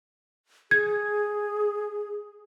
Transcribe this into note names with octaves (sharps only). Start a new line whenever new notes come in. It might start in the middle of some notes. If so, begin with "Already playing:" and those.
G#4 G#6